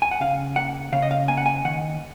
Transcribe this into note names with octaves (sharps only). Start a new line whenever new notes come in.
G#5
F#5
C#3 F5
A#3 F#5
C#3 F5
D#5
F5
A#3 G#5
F#5
G#5
D#3 F#5